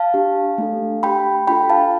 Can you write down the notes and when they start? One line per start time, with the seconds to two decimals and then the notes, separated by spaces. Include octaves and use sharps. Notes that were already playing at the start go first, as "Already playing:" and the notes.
Already playing: F5 A5
0.14 D4 G4
0.58 A3 D4 A4
1.02 D4 G4 G5 B5
1.47 D4 F4 A4 G5 B5
1.70 F5 A5